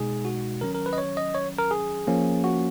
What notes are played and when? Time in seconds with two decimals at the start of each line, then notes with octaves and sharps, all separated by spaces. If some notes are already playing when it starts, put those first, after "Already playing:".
Already playing: B2 G#3 D#4 G#4
0.25 F#4
0.61 D#3 F#3 C#4 A#4
0.75 A#4
0.86 B4
0.93 D#5
0.98 C#5
1.17 D#5
1.35 C#5
1.58 A#4
1.71 G#4
2.07 F3 A#3 C#4
2.44 F#4